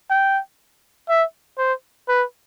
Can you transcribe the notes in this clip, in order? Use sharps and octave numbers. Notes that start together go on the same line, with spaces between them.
G5
E5
C5
B4